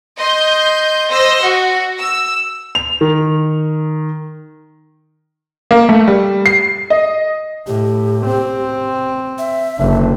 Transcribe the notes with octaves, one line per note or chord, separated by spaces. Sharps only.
D#5 C6 G6
C5 D#5 C6 E6 A#6
F#4
E6
F7
D#3
A#3
A3
G3
C7
D#5
A2 G4
C4
E5
F#1 D3